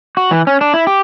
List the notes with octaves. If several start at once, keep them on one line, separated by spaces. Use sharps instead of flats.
F#4
E3
C#4
D4
E4
G4